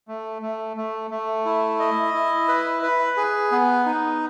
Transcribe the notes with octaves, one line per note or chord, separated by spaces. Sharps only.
A3
A3
A3
A3
E4
D#5
E4
B4
B4
G#4
B3
D#4